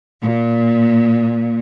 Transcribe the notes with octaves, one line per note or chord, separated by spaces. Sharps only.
A#2